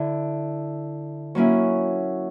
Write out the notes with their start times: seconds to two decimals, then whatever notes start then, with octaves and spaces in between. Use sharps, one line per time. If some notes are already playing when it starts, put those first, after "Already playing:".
Already playing: D3 E4
1.35 F#3 A#3 C#4 E4